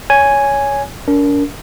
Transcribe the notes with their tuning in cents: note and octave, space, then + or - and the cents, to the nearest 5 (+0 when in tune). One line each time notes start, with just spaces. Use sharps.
C#5 +15 G#5 +0
D4 -45 A#4 +0